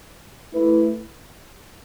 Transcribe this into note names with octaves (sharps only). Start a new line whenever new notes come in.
A3 E4 B4